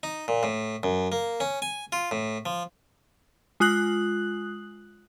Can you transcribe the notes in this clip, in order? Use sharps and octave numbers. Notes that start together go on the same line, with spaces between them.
D#4
A#2
A2
F#2
A#3
C#4
G#5
F4
A2
F3
G#3 F4 D#6 F#6 F#7